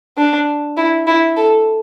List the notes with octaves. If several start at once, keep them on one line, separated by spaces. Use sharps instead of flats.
D4
E4
E4
A4